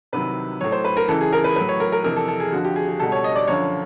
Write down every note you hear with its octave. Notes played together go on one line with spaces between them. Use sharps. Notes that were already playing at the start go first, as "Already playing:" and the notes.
C2 C3 D#3 F#3 B4
A2 F#3 C#5
C5
B4
A#4
C#2 C#3 E3 A4
G#4
A#4
B4
A2 F#3 B4
C#5
A#4
A#4
F2 C3 E3 A#4
A4
A4
G#4
F2 D3 F3 F#4
G4
G#4
G#4
C#2 B2 G3 A4
C#5
D#5
D5
F#2 D3 F3 C#5